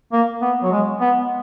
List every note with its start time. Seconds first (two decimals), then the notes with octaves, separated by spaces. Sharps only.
0.12 A#3
0.42 B3
0.63 F#3
0.71 G#3
1.01 B3